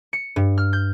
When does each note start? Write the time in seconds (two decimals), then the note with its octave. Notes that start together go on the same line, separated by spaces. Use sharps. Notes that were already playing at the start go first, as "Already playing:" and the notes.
0.13 C#7
0.36 G2
0.58 F6
0.73 G6